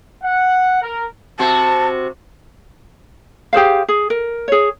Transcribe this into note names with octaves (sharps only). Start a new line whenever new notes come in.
F#5
A#4
C3 F#4 C5 A5
G4 G#4 C5 F5
G#4
A#4
G#4 C#5